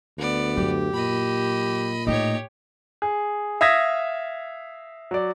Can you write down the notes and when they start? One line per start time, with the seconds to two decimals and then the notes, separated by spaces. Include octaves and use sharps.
0.18 D2 B3 D5
0.56 F#2 F#3 G4
0.94 A#2 D#5 B5
2.07 A2 A3 D#4 G4 C#5
3.02 G#4
3.61 E5 F5 D#6 G#6 A#6 B6
5.11 F#3 D5